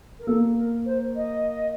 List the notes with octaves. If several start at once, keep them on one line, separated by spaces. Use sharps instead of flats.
A#4
A#3 A4
A#4
C5
D#5